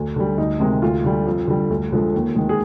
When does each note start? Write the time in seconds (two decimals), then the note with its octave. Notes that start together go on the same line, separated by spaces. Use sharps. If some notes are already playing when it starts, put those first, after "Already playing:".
Already playing: D2
0.16 D3 G3
0.38 D2 D#4
0.60 C3 D#3 G#3
0.82 D2 F4
1.04 D3 G3
1.27 F2
1.48 D3 G3
1.70 D2
1.92 D3 F3 G#3
2.14 D#2
2.36 D#3 G#3
2.49 G#4